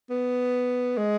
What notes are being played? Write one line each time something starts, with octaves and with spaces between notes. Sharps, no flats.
B3
G#3